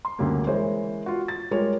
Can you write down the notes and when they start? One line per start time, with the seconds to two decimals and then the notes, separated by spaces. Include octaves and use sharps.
0.05 C6
0.19 D2 C#3 G3 A#3
0.47 E3 G#3 A#4 C5 C#5
1.06 F4 F#4
1.28 A6
1.51 G3 G#3 F4 A#4 C#5